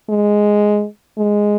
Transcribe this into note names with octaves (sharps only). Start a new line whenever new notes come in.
G#3
G#3